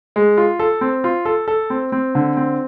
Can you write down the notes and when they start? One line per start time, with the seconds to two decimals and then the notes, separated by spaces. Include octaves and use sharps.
0.16 G#3
0.38 F4
0.59 A4
0.81 C4
1.04 F4
1.25 A4
1.48 A4
1.70 C4
1.92 C4
2.15 D3
2.37 C4